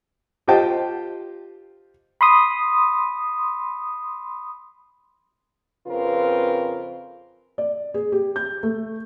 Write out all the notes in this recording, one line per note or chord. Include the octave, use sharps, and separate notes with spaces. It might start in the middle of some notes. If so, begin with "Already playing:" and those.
F4 G4 C5 D#5 G5 A5
B5 C6 D#6
F2 C#3 C4 F4 A#4 B4
D5
G#4
G4
G6
A3